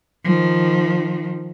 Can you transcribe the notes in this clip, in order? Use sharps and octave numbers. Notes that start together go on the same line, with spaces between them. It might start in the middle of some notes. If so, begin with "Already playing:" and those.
D#3 F3